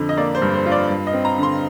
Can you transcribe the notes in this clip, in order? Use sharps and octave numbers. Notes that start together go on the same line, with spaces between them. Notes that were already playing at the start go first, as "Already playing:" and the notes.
Already playing: F2 D3
D#5
A#3 D5
C5
G2
C5
F4
D5
G2
D#5
C4
A#5
D3 C6